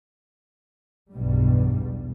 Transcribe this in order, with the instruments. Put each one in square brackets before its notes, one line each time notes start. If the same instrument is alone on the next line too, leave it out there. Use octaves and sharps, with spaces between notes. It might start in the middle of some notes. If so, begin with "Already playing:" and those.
[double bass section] B1 E2 G2 B2 G3